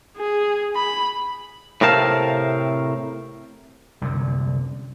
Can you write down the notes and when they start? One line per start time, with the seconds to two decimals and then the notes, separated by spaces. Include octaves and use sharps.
0.17 G#4
0.76 B5
1.81 A2 C3 C4 A#4 F5 A5
4.01 C2 F#2 D3